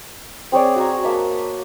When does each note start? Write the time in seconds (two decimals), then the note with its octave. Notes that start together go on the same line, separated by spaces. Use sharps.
0.52 C4 G#4 C#5 D5
0.76 F#4 A#5 C#6
1.03 A#3 E5 A5